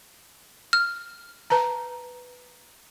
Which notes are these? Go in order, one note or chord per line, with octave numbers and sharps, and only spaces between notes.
F6
B4 A5 A#5